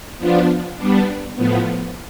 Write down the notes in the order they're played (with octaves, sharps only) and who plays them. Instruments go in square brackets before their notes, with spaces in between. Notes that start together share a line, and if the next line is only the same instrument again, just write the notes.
[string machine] F3 B3 D4 F4
G3 B3 D4
A2 F3 B3